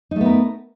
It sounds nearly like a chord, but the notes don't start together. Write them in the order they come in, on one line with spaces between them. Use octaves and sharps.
D#4 A3 B3 A#4